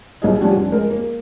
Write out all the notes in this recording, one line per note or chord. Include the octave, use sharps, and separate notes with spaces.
C2 G#4 D#5
F3 G3 C#4 D4 F#4 G4
F1
G#3 A#4
A#3